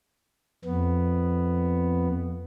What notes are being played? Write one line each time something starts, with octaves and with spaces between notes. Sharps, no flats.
F2 B3